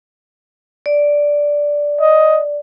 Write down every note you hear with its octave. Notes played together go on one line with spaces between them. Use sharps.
D5
D#5